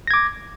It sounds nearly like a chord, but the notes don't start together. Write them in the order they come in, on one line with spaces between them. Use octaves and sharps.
A#6 G#6 D6